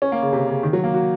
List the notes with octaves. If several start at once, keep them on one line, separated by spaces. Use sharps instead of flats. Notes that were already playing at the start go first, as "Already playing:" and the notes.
C#4
A#3
C#3
C3
C#3
D#3
F#3
A#3
F#4